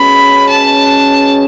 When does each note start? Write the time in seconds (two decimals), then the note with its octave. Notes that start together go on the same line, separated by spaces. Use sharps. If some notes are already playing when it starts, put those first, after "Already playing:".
Already playing: B2 G#3 C#4 B5
0.49 A5